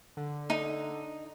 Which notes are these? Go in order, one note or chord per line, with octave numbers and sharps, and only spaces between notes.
D3
D#4